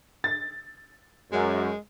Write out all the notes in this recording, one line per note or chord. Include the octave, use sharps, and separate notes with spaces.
A6
F#2 G#3